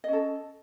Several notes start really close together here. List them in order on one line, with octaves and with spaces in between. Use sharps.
D#5 C#4 A4